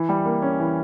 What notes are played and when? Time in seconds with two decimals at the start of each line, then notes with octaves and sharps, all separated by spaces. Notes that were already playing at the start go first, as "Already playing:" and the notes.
Already playing: E3
0.09 G3
0.26 A#3
0.42 C#4
0.59 E3